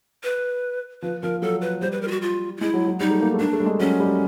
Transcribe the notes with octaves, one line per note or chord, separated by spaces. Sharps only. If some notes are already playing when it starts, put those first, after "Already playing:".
B4
F3 B4
F3 A#4
F#3 A4
B4
G3 C5
B4
A#4
F4
F#4
F4
F4
G#3 E4
F#3
F#3
G3 D#4
A3
A#3
A3
A#3 D4
A3
G3
G#3
F#3 C#4
G3